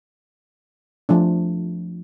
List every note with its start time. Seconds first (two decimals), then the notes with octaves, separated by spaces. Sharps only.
1.09 F3 A3 D4